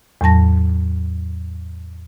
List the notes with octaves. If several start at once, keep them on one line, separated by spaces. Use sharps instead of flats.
E2 A2 F#3 A5 A#6